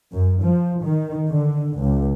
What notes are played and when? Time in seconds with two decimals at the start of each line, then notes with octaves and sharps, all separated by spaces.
0.12 F#2
0.44 F3
0.84 D#3
1.30 D3
1.78 C#2